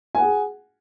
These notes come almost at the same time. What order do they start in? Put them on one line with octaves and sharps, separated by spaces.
G#5 F#5 G#4